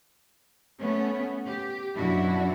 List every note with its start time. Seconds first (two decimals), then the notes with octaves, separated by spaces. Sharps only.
0.79 A3 B3 C#4
1.47 G4
1.96 F#2 B2 D4 E4 F#4